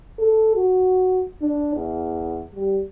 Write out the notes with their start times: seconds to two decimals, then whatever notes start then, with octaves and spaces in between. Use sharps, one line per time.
0.20 A4
0.56 F#4
1.42 D4
1.76 E2
2.56 G3